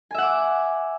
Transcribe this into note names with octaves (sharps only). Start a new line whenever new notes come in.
E5 F#5 G#5 D6